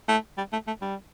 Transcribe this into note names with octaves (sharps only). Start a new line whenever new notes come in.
A3
G3
A3
A3
G3